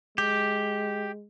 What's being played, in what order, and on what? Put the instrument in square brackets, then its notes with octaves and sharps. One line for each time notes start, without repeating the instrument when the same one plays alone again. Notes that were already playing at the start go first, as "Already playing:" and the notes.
[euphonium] G#3 [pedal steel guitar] G4